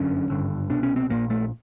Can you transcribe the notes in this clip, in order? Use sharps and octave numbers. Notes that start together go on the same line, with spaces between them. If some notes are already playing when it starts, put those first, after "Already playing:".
Already playing: G1 F#2 D3 C#4
G#1 G2 D3
C2 B2 D4
C#4
C4
A#1 A#2 A#3
A3